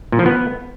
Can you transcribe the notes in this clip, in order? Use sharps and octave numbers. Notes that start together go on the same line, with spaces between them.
A#2
F3
B3